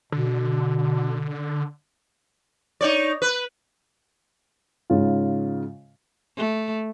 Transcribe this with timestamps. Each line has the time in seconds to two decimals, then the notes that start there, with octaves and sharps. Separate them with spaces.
0.12 B2 D3
2.81 D#4 C#5 D5
3.22 B4
4.90 G#2 C#3 F4
6.36 A3